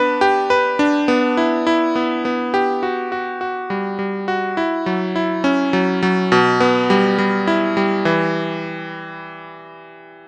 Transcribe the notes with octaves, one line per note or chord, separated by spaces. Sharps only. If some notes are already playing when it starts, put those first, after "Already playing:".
Already playing: B3 D4 B4
G4
B4
D4
B3
E4
E4
B3
B3
G4
F#4
F#4
F#4
G3
G3
F#4
E4
F#3
E4
C#4
F#3
F#3
B2
B3
G3
G3
E4
G3
E3